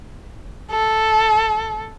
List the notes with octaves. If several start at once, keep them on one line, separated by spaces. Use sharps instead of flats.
A4